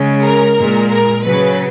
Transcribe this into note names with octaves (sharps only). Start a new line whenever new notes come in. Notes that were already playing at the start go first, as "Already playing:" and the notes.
Already playing: C#3 G#3
A#4
A#2 G#3
A#4
C#3 F#3 B4